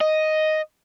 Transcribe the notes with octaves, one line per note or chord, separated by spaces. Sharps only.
D#5